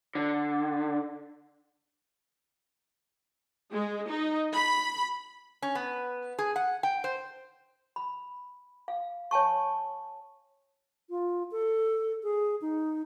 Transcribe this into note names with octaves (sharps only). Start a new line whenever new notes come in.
D3
G#3
D#4
B5
C#4
B3
G#4
F#5
G5
C5
B5
F5
C#5 G#5 A5 C#6
F4
A4
G#4
D#4